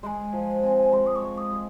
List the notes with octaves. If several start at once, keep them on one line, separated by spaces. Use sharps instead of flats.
G#3 G#5 C6
F3
C4
G#3 C6
D#6
C#6
G#3
D#6
G#3